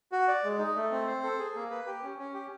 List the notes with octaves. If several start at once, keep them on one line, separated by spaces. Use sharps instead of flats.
F#4
D5
G#3
D#4
A3
C4
C5
A4
G#4
A#3
B4
G4
C#4
C#4
G4